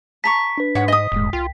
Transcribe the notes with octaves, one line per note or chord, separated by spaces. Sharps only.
A5 A#5 C#6 B6
D4 B4
G#2 C#5 F#5
D#5 D#6
D#1 E2 G#2 G#3
C2 F4 G5